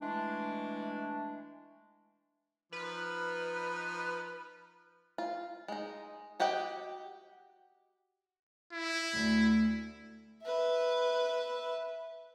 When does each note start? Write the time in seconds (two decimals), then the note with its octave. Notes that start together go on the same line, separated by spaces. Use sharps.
0.01 E3 G#3 A3 D4
2.72 F3 D#4 B4
5.18 F4
5.68 G#3 D#4
6.40 F#4 G4 D#5 F#5 G5
8.72 E4
9.13 D2
10.43 B4 E5